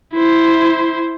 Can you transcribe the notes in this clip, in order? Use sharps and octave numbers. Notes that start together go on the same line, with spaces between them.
E4 C5